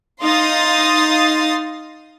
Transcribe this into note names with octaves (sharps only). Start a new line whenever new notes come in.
D#4 F5 C6 D#6 A6